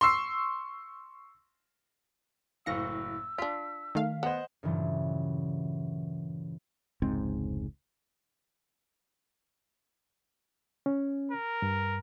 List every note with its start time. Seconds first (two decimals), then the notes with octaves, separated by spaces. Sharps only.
0.01 C6 C#6 E6 C7
2.66 F#1 A2 F5 E6 A#6 C#7
3.38 D4 F4 B6
3.95 D#3 A3 F5
4.23 B3 C5 D#5 F#5
4.63 G2 A#2 C#3 E3 F#3 G3
7.02 F1 C#2 G#2 C4
10.86 C#4
11.32 A#4
11.62 G2